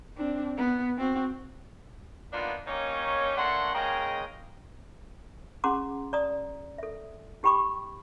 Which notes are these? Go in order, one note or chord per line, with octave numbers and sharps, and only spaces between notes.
C4 D4
B3
C4 F#4
A#3 B3 D4 D#4 F4
A#3 C#4 D#4 G4 C#5
A3 A#3 D4 C#5 F#5 C6
C#3 G#3 A#3 D#5 G5 A#5
C#4 G#4 F#5 A#5 C6 D6
D5 A#5 D#6
A4 E5
D#4 G4 G5 B5 C#6 D6